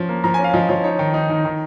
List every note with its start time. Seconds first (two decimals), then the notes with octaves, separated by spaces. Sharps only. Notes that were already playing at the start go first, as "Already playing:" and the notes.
Already playing: F3 C#4
0.09 A#3
0.24 F3 A#5
0.34 C#4 G#5
0.44 F5
0.54 F3 D#5
0.69 F3 C#5
0.84 D#4 C#5
0.99 D#3
1.14 D#4
1.30 D#3
1.45 D#3